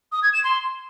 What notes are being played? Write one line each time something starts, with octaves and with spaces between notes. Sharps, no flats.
D#6
G#6
E7
C6